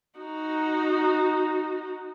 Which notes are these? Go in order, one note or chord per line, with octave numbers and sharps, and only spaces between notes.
D#4 F#4